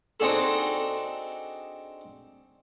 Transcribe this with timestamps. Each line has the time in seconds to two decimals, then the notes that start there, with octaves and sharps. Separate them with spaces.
0.20 C4 D4 D#4 F#4 G#4 A4